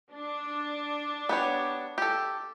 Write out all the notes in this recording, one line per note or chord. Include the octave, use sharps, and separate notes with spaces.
D4
B3 G4 C#5
G4 A4